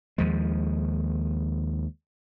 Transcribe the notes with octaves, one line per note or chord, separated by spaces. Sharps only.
D#2 F3 G#3